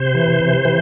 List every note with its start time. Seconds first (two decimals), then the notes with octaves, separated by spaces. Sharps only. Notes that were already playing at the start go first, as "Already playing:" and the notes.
Already playing: C3 C5
0.14 E3
0.40 C3
0.65 E3